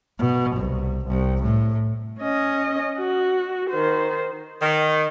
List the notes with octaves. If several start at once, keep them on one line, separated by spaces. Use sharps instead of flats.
B2
C2
C2
A2
C#4 D#5
F#4
D#3 C5
D#3